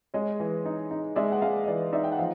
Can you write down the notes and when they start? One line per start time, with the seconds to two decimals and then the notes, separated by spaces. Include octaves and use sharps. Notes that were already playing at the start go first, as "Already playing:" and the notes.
0.14 G#3 C#5 D#5
0.40 E3
0.65 D#4
0.91 D#4
1.16 G#3 D5 E5
1.32 F#5
1.42 G#3 D#5 F5
1.64 D#5
1.68 E3 D5 E5
1.92 D#4 D5 E5
2.04 G5
2.12 F#5
2.19 F3 D#5 F5